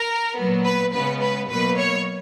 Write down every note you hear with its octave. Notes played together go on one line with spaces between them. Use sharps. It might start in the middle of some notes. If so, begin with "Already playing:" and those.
Already playing: A#4
A#2 F#3 B3
B4
C#3 G#3 B3 B4
B4
B2 F#3 A#3 B4
C#5